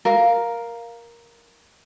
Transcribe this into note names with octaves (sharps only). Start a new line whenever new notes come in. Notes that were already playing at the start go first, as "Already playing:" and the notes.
A#4 F5